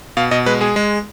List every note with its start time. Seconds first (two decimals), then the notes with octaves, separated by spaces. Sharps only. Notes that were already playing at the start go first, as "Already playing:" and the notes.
0.17 B2 F5
0.31 B2 D#5
0.46 G#3 B4
0.61 G#3 G#4
0.76 G#3